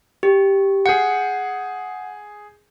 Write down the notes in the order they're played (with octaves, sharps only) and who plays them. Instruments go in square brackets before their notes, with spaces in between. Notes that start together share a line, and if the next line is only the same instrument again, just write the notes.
[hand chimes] G4
[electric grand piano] G#4 G6 C#7 [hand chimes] F#5